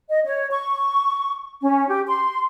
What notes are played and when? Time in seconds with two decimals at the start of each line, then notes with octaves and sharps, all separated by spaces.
0.10 D#5
0.25 C#5
0.51 C#6
1.62 C#4
1.89 G4
2.07 C6